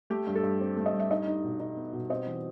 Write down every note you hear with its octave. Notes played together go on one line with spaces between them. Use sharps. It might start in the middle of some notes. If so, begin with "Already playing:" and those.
A3 G4
G2
A4
G2
C4
A3
D#5
G2
E5
D#4 D#5
D#4
B2
D#4
B3
B2
C4 D#5
E3